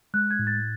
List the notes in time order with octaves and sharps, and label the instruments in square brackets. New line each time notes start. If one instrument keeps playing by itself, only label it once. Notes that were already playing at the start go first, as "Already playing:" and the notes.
[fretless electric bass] G#3 [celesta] F#6
[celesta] G#6
[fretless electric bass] A2
[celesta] A6